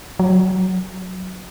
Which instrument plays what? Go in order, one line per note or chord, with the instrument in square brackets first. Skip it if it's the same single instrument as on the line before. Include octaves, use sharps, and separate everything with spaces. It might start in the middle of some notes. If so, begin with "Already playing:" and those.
[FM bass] F#3